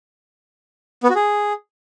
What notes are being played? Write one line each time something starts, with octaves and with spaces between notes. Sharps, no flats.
B3
F#4
G#4